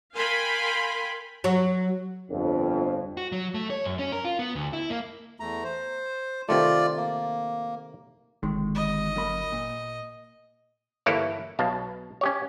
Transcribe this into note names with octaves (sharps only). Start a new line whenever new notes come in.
A#4 F5 G5 G#5 B5 C6
F#3
G1 F2
F#4
F#3
A3
C#5
F#2
C#4
A#4
F4
B3
D2
E4
A#3
E2 A3 A#5
C5
C3 D#3 A3 F4 D5
A#3
G1 C3 D#3 G#3
D#5
F#2 A#3 B5
A#2
G1 E3 A#3 E4 A4 C#5
B1 B2 F5 A5
C#4 G4 C#5